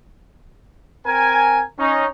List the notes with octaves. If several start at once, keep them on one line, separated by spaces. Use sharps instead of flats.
C4 A#4 G#5
C#4 D#4